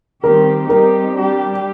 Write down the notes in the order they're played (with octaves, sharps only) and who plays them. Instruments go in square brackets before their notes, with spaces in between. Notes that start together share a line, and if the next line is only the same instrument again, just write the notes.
[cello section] D#3 G3 C4 G4 [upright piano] A#4
[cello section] G3 C4 D#4 G4 [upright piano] A#4
[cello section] G3 D4 G4